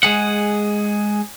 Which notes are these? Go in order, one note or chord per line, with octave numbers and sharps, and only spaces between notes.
G#3 G#4 F#5